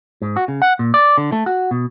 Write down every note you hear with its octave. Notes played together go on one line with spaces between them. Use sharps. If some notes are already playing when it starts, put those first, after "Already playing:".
G#2
F#4
C#3
F#5
A#2
D5
D3
A3
F#4
B2